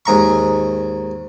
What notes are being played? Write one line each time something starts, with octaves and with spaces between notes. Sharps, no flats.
D#2 G#2 A#5 C#6